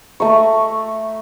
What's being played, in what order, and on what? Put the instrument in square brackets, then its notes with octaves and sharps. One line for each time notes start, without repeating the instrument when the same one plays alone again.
[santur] A3 A#5 C#6